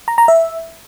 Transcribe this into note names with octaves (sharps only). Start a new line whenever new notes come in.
A#5
A#5
E5